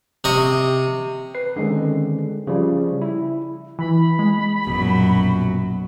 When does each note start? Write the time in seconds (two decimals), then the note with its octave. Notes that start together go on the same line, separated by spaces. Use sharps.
0.24 C3 D#5 C#6
1.35 B4 C7
1.56 D3 D#3 G#3 C4 C#4
2.47 C#3 F3 G3
3.02 E4
3.79 E3 B5
4.19 G#3
4.67 A#1 F#2 B2 F#3